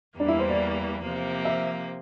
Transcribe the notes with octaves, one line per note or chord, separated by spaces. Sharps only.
E2 E3 G3 A#3 D4
E4
C5
D5
C3 F3 A#3
E5